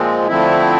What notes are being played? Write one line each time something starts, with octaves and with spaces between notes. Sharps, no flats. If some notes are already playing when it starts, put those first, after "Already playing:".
Already playing: A#2 F3 G#3 C4
D3 F3 A3 C4 E4